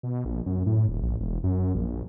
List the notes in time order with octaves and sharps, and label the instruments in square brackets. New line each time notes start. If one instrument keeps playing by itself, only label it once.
[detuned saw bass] B2
A#1
F#2
A2
D#1
A#1
E1
F#2
A#1